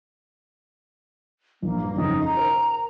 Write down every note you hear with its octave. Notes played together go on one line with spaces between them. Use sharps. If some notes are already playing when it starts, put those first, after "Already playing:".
A#1 A#3
G2
F2 C#3 D#4
A#5
A#4